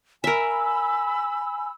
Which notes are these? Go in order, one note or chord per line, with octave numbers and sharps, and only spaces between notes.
A#4 E5 G#5 B5 E6